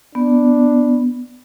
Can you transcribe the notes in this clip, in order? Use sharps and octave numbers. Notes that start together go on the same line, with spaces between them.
B3 D4